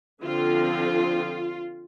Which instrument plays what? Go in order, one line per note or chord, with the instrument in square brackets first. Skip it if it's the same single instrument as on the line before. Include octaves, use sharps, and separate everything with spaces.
[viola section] D3 F3 C4 F4